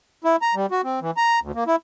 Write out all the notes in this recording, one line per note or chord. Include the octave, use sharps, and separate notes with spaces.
E4
A#5
G3
F#4
C4
E3
A#5
D2
A#3
E4